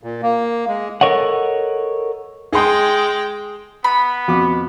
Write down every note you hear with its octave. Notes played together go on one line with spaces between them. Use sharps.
A#2
A#3
G#3
A4 A#4 C#5 D#5 F#5
G#3 G#4 G5 C6
B3 B5
F2 B2 D6